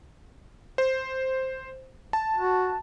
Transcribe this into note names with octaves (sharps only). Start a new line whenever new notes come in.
C5
A5
F#4